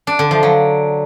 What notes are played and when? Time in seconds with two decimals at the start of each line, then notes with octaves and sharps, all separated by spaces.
0.07 D4
0.19 D3
0.31 F3
0.43 F#3